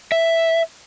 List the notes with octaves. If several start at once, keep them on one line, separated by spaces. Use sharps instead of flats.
E5